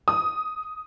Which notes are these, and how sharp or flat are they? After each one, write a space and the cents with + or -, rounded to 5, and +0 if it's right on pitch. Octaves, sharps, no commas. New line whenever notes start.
D#6 +5